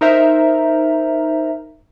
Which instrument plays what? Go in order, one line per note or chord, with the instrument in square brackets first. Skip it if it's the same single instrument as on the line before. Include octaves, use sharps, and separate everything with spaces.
[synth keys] D#4 A#4 C5 E5 A#5